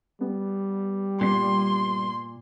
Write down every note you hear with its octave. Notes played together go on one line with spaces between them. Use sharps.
G3 B3
G2 A#2 B3 C6 C7